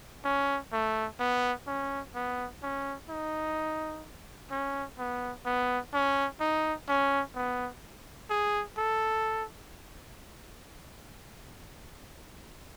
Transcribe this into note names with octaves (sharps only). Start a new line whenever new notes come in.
C#4
A3
B3
C#4
B3
C#4
D#4
C#4
B3
B3
C#4
D#4
C#4
B3
G#4
A4